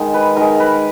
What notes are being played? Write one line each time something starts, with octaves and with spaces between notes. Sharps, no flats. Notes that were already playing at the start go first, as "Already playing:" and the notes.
Already playing: D#3 G#3
B4
D#3 G#3 A#4
B4